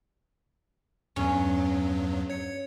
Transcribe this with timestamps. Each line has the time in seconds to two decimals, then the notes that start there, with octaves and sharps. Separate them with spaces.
1.16 E2 G2 F#3 C#4
2.30 C#5 C#7